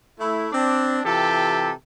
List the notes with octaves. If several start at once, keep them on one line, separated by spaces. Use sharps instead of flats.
A3 E4
C4 D4
C3 E3 F4 G4 A4